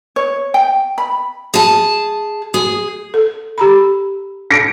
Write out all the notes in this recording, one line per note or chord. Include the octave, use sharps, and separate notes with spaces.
C#5
G5
B5
G#4 A5
G#4
A4
G4 A#5 B5
A#6 C#7 D7